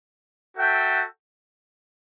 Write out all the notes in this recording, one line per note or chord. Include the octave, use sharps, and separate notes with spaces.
F#4 A4 E5 G5